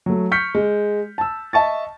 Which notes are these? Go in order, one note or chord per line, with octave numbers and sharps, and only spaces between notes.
F#3 A3
C#6 F6 G6 B6 C#7
G#3
A5 E6
D#5 E5 A5 C#6 A6